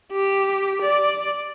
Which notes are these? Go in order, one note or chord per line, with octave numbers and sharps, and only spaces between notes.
G4
D5